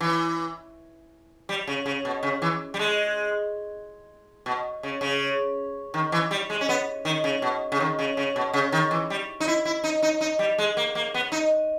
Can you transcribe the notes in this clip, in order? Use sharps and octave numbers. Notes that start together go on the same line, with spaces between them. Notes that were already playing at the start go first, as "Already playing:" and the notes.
E3
G3
C#3
C#3
B2
C#3
E3
G3
G#3
B2
C#3
C#3
D#3
E3
G3
G#3
C#4
B3
D#3
C#3
B2
C#3
D#3
C#3
C#3
B2
C#3
D#3
E3
G3
D#4
E4
E4
D#4
D#4
D#4
G3
G#3
A#3
A#3
B3
D#4